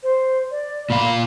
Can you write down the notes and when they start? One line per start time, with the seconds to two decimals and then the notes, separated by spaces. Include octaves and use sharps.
0.03 C5
0.51 D5
0.90 A#2 F5 B5